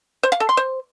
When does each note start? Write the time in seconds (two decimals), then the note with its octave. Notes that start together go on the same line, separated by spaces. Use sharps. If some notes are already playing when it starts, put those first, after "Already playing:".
0.23 C5
0.32 F5
0.40 A4
0.49 C6
0.57 C5